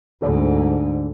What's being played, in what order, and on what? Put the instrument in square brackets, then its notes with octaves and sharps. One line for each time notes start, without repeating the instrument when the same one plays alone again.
[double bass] D2 G#2 [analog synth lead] D3